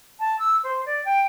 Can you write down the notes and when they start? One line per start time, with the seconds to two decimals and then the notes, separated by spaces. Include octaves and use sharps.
0.19 A5
0.38 E6
0.63 C5
0.85 D5
1.05 G5